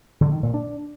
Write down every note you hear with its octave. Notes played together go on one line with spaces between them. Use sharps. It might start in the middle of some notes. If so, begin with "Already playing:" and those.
D3
D#3
A#2
D4